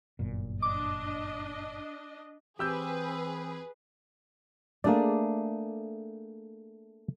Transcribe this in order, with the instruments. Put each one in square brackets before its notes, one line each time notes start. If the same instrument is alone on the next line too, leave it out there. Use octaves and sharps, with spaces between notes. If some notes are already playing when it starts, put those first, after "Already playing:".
[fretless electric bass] G1 F#2 A#2
[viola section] D4 D#5 [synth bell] D6
[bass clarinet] E3 [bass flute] C4 [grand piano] G4 E6 G6 [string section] G#4 B4
[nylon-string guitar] A3 G#4 [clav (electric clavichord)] A#3 D4 D5